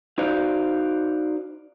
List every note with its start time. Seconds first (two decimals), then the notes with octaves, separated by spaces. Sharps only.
0.18 D#4 F#4 C5 D5 F5